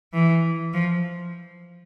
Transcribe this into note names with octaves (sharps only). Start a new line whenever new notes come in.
E3
F3